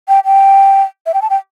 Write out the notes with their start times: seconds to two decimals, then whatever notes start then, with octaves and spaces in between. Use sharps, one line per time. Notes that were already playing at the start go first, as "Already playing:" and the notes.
0.08 G5
0.25 G5
1.06 E5
1.14 G5
1.22 A5
1.30 G5